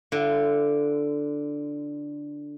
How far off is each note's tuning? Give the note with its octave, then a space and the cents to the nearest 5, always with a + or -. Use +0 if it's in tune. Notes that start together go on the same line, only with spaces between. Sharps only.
D3 +0 F4 -45